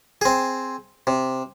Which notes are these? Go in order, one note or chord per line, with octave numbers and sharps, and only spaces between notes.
C4 G#4
C3